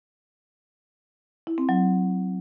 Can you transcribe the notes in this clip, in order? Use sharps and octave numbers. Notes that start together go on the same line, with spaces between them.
E4
C4
F#3